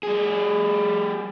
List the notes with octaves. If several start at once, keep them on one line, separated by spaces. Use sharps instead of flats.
G3 G#4